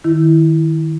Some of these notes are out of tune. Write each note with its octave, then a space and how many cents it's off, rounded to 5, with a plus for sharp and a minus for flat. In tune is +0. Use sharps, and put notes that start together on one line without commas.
D#3 +0 E4 +0